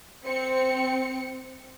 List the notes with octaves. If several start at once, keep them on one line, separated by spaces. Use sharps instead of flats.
C4 C#7